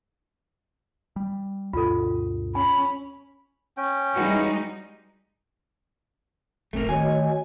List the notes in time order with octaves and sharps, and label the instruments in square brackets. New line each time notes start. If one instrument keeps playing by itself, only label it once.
[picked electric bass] G3
[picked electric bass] D2 G2 B2 [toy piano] F4 A4
[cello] C#4 [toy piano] G#5 [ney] B5
[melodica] C#4 G5
[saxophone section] E3 F#4 [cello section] G3 G#3 D#4
[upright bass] D1 A1 [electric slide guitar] A3 C4 A#4
[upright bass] D#3 A3 [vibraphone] F#4 C#5 D#5 [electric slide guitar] G#5